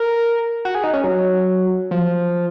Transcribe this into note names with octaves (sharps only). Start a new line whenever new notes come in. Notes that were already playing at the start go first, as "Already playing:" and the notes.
Already playing: A#4
F#4
G#4
D#4
C#4
F#3
F3